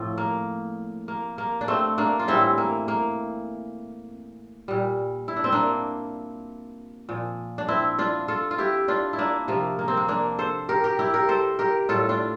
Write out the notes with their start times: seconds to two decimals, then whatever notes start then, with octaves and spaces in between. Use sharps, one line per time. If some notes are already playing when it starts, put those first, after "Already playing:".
Already playing: A2 F3 C4
0.18 A#3
1.08 A#3
1.38 A#3
1.61 D4
1.68 A3 C4
1.98 A#3 D4
2.19 F4
2.28 A2 E3 G3 C4 E4
2.58 A#3
2.88 A#3
4.68 A#2 G3
5.28 E4
5.36 D4
5.44 C4
5.52 A#3 D4
7.09 A#2 F3
7.58 D4
7.68 C4 E4
7.98 D4 F4
8.28 F4 A4
8.51 F4
8.58 E4 G4
8.88 D4 F4
9.13 E4
9.19 A#3 D4
9.48 C3 F3 A#3
9.79 A#3
9.88 C4
9.97 A#3
10.08 A#3 D4
10.39 A4 C5
10.69 G4 A#4
10.84 G4 A#4
10.99 E4 G4
11.14 G4 A#4
11.29 A4 C5
11.59 G4 A#4
11.89 A2 G3 F4 A4
12.09 D4 F4